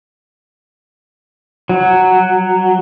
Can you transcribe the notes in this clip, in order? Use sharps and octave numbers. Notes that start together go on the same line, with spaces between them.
F#3